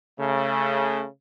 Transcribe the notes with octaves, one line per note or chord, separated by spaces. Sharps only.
C#3 A3